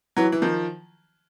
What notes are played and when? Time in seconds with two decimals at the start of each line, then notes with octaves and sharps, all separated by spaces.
0.16 E3 F#3
0.32 E3
0.42 D#3 F3